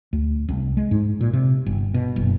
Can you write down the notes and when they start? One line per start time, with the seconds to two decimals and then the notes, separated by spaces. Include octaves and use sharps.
0.13 D2
0.49 C2
0.77 G#3
0.91 G#2
1.21 A#2
1.33 C3
1.66 G1
1.94 B2
2.16 F#1